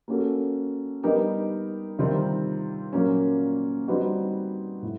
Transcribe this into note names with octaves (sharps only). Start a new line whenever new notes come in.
A#3 C#4 F#4 A4
G3 B3 D#4 G4 A#4
C3 D#3 G3 C4 F4
A#2 F#3 A#3 C#4
G3 C4 D#4 F#4 B4
A2